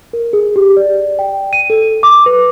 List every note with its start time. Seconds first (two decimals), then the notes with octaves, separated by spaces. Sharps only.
0.13 A#4
0.33 G#4
0.56 G4
0.77 D5
1.19 G5
1.53 D#7
1.70 A4
2.03 D6
2.26 B4